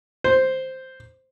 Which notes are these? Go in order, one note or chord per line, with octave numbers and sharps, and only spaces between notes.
C5